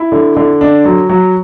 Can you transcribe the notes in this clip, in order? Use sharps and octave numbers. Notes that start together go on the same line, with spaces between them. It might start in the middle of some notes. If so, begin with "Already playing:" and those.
Already playing: E4
D3
D3
D4
F#3
F#3